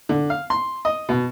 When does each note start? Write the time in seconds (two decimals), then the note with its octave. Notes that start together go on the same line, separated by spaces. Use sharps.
0.09 D3
0.30 F5
0.50 C6
0.85 D#5
1.09 B2